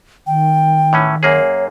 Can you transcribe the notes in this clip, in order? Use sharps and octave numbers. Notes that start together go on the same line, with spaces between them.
D#3 G5
A2 E3 C#4
F#2 A#3 G#4 C#5